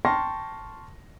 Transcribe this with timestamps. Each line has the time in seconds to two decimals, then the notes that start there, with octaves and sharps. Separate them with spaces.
0.05 G5 A5 C6 C#6 F6 A#6